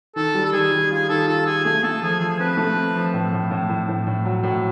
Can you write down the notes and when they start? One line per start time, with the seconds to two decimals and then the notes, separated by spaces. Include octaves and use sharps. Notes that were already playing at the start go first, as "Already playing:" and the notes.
0.16 D#3 A4
0.35 G3
0.45 A4
0.53 D#3 G#4
0.72 G3
0.90 F4 G#4
1.09 D#3 A4
1.28 F4 A4
1.46 F4 G#4
1.65 A3 G#4
1.83 A3 A4
2.01 F3 G#4
2.20 F3 G#4
2.39 C4 B4
2.57 A3
2.76 C4
2.95 F3
3.14 A2
3.32 A2
3.51 A2
3.69 A2
3.88 A2
4.07 A2
4.25 F#3
4.43 A2